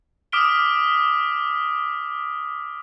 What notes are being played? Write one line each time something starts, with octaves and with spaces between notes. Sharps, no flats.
D6 D#6 F6 B6 D7 G7